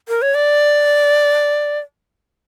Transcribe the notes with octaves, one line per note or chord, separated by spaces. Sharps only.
A#4
C#5
D5